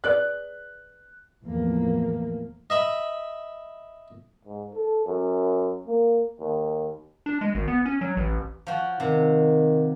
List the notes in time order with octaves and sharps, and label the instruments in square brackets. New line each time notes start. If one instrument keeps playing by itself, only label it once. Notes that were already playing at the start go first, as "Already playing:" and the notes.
[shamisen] G#4 B4 D5 [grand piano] F#6
[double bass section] E2 A2 E3 F3 A3 A#3
[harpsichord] D#5 E5 B5
[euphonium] G#2
A4
F#2
A#3
D#2
[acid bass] D4
G#3
G#1
B3
C#4
F#3
A1
[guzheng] F3 F#4
[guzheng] C3 [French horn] D#3